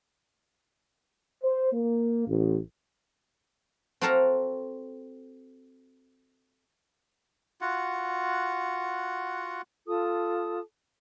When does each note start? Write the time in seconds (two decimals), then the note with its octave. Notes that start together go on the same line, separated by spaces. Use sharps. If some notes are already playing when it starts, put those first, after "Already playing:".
1.43 C5
1.72 A#3
2.27 A1
4.01 C4 F#4 A4 F5 A5 A#5
7.61 F4 F#4 F#5
9.88 F4 A4 A5 D#6